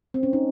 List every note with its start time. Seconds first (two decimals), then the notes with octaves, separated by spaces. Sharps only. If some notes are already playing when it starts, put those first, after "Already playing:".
0.14 C4
0.23 C#4
0.33 D#4